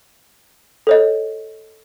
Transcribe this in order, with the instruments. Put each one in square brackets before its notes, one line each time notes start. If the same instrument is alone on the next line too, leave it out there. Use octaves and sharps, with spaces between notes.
[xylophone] A4 C#5 D#5